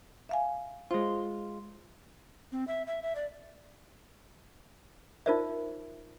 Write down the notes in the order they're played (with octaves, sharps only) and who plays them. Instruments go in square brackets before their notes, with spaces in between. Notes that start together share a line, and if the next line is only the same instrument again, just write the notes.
[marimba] E5 F5 G#5
[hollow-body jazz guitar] G#3 F4 [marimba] C5
[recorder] C4
E5
E5
E5
D5
[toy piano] D#4 F4 A#4 C5 D5 E5